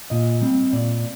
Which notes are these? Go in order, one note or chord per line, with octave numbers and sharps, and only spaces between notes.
A#2 D#5
G3 C4
A#2 D5